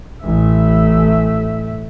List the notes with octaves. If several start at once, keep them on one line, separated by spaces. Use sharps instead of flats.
A1 A3 E5